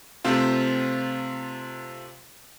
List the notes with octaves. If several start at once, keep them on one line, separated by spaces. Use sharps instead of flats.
C3 A3 C4 F4